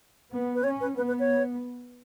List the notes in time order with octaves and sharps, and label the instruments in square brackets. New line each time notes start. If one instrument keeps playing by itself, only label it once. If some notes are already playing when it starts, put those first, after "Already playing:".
[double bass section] B3
[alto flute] B4
[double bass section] C#4 [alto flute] C#5
[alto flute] B4
[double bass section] B3 [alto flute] B4
[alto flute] B4
C#5